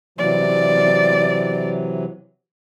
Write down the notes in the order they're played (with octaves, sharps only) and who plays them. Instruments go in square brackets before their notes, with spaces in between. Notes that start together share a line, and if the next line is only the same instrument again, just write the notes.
[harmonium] C3 E3 F#3 [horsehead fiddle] D5